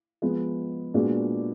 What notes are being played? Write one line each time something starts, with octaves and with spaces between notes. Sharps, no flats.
F3 G#3 B3
A#2 G#3 B3 D4 F#4